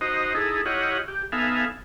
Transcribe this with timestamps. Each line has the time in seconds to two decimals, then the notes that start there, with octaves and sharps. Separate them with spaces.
0.01 D#4 F#4 C5 D#5
0.35 D#4 E4 G#4 A4
0.66 E4 F4 G4 C#5 D#5 F#5
1.08 G4
1.32 B3 D#4 A4 E5 F5 G#5